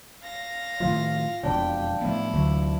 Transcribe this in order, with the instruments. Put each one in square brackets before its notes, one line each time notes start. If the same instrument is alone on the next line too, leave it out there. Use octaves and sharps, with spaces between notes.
[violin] F5 A#6
[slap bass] A2 D#3 F3 [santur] F4
[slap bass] E1 F2 B2 [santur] D4 B5 [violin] G5
[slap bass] A2 F3 B3 [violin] E4
[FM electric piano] D2 [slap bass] E3 F#3